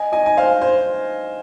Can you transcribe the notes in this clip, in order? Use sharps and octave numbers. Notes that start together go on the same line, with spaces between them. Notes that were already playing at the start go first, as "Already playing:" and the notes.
Already playing: D#5 G#5
D#5 G#5
G#5
C5 F5
C5